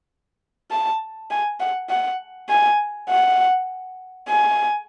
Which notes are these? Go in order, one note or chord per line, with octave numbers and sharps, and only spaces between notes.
A5
G#5
F#5
F#5
G#5
F#5
G#5